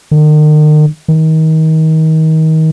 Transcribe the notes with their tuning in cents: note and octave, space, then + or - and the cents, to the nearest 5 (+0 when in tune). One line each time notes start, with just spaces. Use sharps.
D#3 -40
D#3 +30